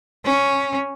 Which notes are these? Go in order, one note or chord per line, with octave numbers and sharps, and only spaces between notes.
C#4